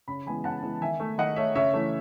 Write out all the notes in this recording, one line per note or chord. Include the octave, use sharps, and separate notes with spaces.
C#3 B5
E3 G#3 B3 G#5 B5
C#3 F#5 A5
E3 G#3 B3
D#3 E5 G#5
A3
D#3 D#5 F#5
A3 C#5 E5
C#3 C#5 E5
E3 A3